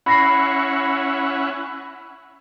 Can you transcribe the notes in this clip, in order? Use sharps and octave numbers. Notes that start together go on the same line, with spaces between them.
C#4 E4 F#5 B5 A#6 C7